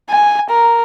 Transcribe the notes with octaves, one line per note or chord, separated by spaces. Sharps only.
G#5
A#4